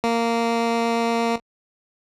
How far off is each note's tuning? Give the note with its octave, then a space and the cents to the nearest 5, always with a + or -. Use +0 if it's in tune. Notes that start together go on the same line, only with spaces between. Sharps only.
A#3 -10